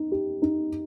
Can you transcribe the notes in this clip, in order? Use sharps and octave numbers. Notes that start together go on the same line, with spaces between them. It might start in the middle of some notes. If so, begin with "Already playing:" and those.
Already playing: D#4
G4
D#4